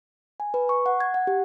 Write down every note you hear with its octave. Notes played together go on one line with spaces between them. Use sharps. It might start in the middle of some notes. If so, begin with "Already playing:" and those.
G#5
B4
C#6
F#5
G#6
F#5
G4